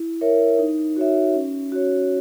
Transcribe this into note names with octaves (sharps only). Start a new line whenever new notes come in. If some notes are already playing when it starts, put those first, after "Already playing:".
Already playing: E4
A#4 C#5 E5
D#4
F#4 C#5 E5
C#4
F#4 C#5